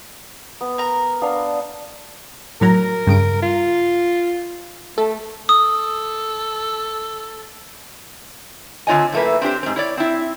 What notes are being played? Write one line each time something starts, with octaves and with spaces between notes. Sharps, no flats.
B3
A#4 A#5
B3 D4 F5
A2 F#3 A#4 A#5
G2 C#3 D7
F4
A3 A4
A4 D#6
D3 C4 F4 C#5 D#5 G#5
F#2 A2 A3 A#3 B4
C4 D4 G4 C5
G#2 C4
E4 C#5 D5
C4 E4